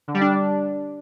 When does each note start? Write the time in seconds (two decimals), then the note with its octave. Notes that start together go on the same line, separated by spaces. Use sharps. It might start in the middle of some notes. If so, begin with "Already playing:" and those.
0.08 D3
0.14 G3
0.21 D4